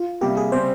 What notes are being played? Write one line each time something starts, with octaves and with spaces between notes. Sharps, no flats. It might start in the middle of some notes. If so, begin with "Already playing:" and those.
Already playing: F4
C3 G3 A#3 G4
G#4
C#3 G3 C4 C5